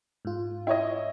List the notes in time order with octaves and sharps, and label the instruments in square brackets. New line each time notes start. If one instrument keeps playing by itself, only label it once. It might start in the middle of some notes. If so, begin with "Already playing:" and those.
[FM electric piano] G#2 F4
[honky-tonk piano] E4 C#5 D#5